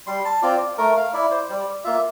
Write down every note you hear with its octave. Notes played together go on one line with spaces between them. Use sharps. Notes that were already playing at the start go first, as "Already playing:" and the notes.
G3 C6
A5
C4 F4 D5
A3 A#4
F5
E4 D5
C5
G3 D5
A#3 F4 E5